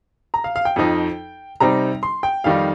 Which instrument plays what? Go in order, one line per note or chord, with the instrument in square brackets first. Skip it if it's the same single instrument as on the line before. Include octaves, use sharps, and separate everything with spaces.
[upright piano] A#5
F5
F5
G5
F2 F3 D#4
C3 G3 C4 D#4 A#5
C6
G5
F2 D#3 G3 D#4 F5